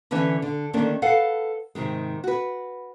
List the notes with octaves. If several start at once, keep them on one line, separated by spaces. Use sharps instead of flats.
D3 E3 C#4 B4 E5
D3
D3 D#3 A3 A#3 C#4 D4
A4 B4 F5 F#5
G#2 C3 D#3 G#3
F#4 B4